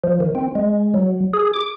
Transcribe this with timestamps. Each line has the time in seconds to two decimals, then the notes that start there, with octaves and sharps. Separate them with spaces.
0.04 F3
0.20 D#3
0.35 C4
0.55 G#3
0.94 F#3
1.34 G#4
1.54 D6